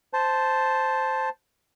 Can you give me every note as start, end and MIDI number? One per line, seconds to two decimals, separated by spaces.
0.13 1.29 72
0.13 1.29 81